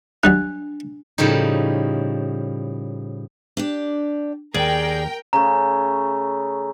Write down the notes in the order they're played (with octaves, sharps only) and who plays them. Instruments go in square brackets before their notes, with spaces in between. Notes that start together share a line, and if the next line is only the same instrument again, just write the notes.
[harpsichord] F#3 G3 D#4 [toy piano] D4 [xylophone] F#6
[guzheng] A2 C#3 F3 G3 D#4
[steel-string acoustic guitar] D4 G4 D5
[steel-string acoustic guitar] D#2 [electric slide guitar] G#4 D5 [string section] A#4 G5
[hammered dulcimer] C#3 A3 [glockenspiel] A#5